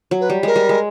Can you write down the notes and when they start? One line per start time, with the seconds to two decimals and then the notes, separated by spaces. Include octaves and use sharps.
0.11 F#3
0.21 B4
0.30 G3
0.43 G#3 A#4
0.56 G3
0.69 G#3